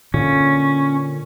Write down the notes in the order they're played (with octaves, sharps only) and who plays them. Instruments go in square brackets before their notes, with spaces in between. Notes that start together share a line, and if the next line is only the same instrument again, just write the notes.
[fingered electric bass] A#2 D3 [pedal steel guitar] C#4